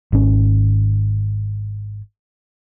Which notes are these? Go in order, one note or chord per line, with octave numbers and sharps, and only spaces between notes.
G#1 C#4